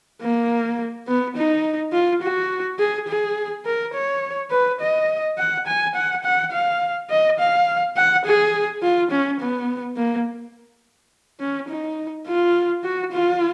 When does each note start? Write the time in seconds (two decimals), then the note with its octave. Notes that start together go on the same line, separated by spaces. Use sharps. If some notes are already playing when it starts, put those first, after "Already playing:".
0.21 A#3
1.07 B3
1.36 D#4
1.93 F4
2.22 F#4
2.79 G#4
3.08 G#4
3.65 A#4
3.94 C#5
4.51 B4
4.80 D#5
5.38 F#5
5.67 G#5
5.95 F#5
6.24 F#5
6.52 F5
7.10 D#5
7.39 F5
7.96 F#5
8.25 G#4
8.82 F4
9.10 C#4
9.40 B3
9.96 A#3
11.40 C#4
11.68 D#4
12.27 F4
12.84 F#4
13.12 F4